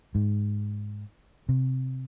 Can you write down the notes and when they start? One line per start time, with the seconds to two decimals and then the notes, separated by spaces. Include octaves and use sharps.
0.15 G#2
1.49 C3